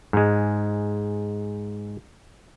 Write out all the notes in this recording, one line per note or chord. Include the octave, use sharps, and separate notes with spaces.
G#2 G#3